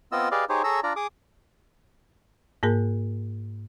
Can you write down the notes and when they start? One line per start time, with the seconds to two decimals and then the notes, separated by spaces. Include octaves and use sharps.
0.12 B3 C4 F4 D#5 E6
0.31 G4 G#4 B4 D5 D#5 F5
0.49 D#4 G4 G#4 C5 C#5
0.64 G#4 A4 C#5 A#5 E6
0.83 D4 F4 D5 A#5
0.96 G#4 D6 D#6
2.63 G#2 A#3 G#4 A#4